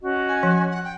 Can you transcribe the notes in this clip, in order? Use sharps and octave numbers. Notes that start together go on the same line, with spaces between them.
C#4 F#4 D#5
G#5
F3
F#5
G5